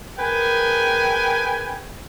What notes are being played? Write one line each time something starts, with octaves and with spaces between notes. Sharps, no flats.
G#4 A#4 B4 G5 G#5